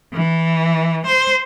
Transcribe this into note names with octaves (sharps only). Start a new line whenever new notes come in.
E3
C5